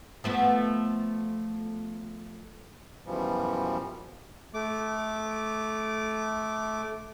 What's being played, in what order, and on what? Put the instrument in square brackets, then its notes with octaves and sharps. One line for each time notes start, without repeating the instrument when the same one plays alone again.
[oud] F3 A3 B3
[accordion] F#2 B2 E3 F3 G3
[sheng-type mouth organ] A3 D6